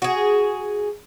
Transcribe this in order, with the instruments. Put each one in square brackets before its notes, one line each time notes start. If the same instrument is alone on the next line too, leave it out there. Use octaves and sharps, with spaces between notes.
[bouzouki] F#4 G#4